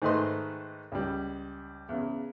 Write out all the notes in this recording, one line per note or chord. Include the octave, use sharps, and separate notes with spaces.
G#2 D#3 A3 B4 D#5 C6
C#2 G3
E2 C#3